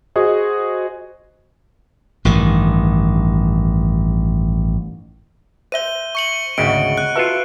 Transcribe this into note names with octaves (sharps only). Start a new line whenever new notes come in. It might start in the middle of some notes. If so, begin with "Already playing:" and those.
F#4 G#4 C5 D#5
A1 G2 D#3
C5 E5 G6 D#7 G7
C#6 C#7 F#7
G#1 D2 C#3 D#5 F#5 D7
F#6
F4 F#4 A4 B4 E5